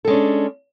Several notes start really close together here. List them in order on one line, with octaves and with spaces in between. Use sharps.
A4 G#3 C#4 D4